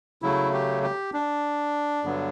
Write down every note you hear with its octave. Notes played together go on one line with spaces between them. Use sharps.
C#3 F#3 A3 E4
G4
G4
D4
G2 D3 F#3 B3